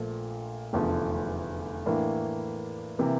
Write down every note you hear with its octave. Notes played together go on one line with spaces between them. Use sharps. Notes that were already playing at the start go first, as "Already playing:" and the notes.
Already playing: A#1 A#2 F3 A3
F1 E2 D3 F3 A3
A2 E3 A#3 D4
C3 E3 A#3